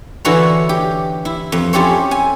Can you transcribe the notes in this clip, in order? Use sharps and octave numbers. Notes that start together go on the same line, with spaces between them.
D3 E3 E4 F#4 C#5 A#5
G4
E4
F2
C#4 E4 G4 A4 C5 C#5
G#5